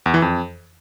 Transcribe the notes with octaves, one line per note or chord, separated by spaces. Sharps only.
E2
E3
F2